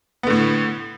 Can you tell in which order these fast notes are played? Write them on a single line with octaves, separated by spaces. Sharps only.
B3 D3 A2